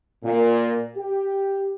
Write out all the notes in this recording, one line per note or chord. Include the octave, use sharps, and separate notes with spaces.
A#2
G4